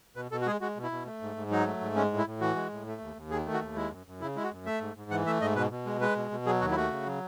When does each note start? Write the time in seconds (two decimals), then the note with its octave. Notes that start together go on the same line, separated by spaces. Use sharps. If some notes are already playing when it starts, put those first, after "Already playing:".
0.16 B2 B4
0.31 B2 A4
0.41 F#4
0.46 G#3 G#4
0.61 G#3 F#4
0.76 B2
0.83 E4
0.91 B2
1.06 A3
1.22 G#2
1.36 G#2
1.51 F#3 D#4
1.66 A3
1.81 G#2
1.96 G#3 C#4
2.11 A2
2.19 E4
2.26 A2
2.41 E3 F#4
2.56 G#3
2.71 A2
2.87 A3
3.01 D#2
3.16 D#2
3.31 D#3 G#4
3.46 A3
3.53 F#4
3.61 D#2
3.76 G#3 E4
3.91 F#2
4.06 F#2
4.21 C#3 E4
4.36 G#3 E4
4.43 F#4
4.52 F#2
4.66 A3 E5
4.81 G#2
4.95 G#2
5.11 E3 F#5
5.26 A3 E5
5.41 G#2 D#5
5.56 B2 B4
5.71 B2
5.86 G#3
6.01 G#3 B4
6.16 B2
6.31 B2
6.46 F#3 G#4
6.61 D#2 F#4
6.71 E4
6.76 A3 F#4
6.91 C#3
7.06 F#3